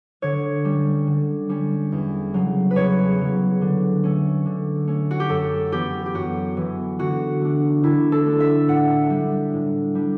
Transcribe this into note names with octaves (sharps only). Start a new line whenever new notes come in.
D3 C#5
G3 C#4
D3
G3 C#4
E2
C#3 F#3
B4
E2 C#5
C#3 F#3
D3
A3 C#4
D3
A3 C#4
F#4
G4
F#2 A4
E3 B3 G4
G4
F#2 F#4
E3 B3
D3 F#4
A3 D4
D3 E4
A4
A3 D4
E5
A2 F#5
G3 D4
A2
G3 D4